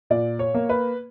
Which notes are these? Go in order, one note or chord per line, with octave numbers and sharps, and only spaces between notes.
A#2 D5
C#5
A#3
B4